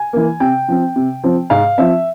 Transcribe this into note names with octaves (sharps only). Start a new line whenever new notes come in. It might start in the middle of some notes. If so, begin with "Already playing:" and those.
Already playing: G#5
E3 A#3
C3 G5
F3 C4
C3
F3 C4
G#2 F5
F3 C4 E5